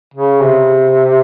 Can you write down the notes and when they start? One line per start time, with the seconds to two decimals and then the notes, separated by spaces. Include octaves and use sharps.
0.14 C#3
0.41 C3